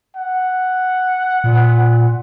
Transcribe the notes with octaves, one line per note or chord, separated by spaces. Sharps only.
F#5
A#2